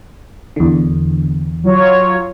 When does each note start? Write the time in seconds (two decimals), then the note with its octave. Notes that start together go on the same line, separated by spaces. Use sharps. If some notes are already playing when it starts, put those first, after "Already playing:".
0.56 E2 D3
1.64 F#3 F4 C#5